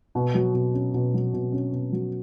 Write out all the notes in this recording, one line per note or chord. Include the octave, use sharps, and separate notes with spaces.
B2
F#3
B2
C#4
B2
F#3
B2
C#4
B2
F#3